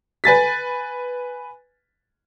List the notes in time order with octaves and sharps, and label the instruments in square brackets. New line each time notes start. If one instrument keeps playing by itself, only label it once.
[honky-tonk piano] B4 G#5 A6 B6